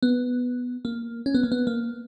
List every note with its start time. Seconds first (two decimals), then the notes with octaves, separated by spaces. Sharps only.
0.03 B3
0.85 A#3
1.26 C#4
1.35 B3
1.43 A#3
1.52 B3
1.67 A#3